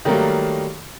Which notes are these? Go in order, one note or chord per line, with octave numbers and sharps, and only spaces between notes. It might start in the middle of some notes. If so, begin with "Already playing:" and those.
D#3 F#3 G3 A3 A#3